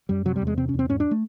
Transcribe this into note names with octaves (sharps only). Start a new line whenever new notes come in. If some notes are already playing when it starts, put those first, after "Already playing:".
F#2 G3
C3 F#3
G3
E2
G#3
C3 C4
C#4
E2
C4
G#2 C#4
D4
A3